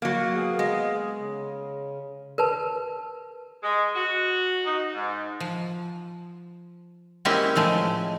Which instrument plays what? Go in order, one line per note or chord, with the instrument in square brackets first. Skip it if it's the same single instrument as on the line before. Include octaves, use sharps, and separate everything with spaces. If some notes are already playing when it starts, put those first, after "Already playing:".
[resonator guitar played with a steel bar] F#3 A#3
[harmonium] B3 G#4 F5
[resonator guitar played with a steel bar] G#3
[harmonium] C#3
[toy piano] A#4 B4 A5
[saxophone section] G#3
F#4
D#4
G#2
[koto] F3
G#3 A#3 C4 C#4 E4 G4
A2 F3 G#3 A3